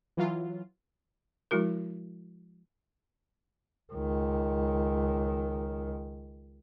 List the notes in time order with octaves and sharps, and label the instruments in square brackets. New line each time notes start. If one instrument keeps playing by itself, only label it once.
[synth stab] E3 F#3 F4
[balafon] F3 G#3 E4 F#4 A#4
[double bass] C#2 D#3